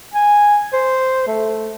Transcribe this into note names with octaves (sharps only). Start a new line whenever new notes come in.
G#5
C5
A3